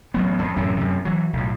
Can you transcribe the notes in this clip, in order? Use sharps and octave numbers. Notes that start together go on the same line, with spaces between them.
A1 F#3 B3
F2
A1 F#2 A2 C3
F#2 C3
E3 F#3
B1 A2